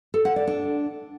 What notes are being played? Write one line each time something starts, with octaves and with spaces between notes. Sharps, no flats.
A4
F#5
D5
D4